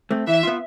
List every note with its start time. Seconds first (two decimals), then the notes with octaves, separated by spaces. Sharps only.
0.11 A3 C4
0.27 E3 E5
0.43 B3 F4